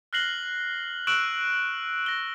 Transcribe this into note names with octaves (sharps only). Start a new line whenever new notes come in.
F6 F#6 A#6 C7 F#7 G7
C#6 E6 F#6 D7 E7 F#7
A#6 G7